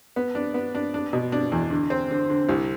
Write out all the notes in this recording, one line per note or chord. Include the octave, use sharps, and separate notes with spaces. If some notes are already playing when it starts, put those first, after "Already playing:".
B3
D4
B3
D4
D4
B2
D4
E2
D3
C4
D3
D3
C2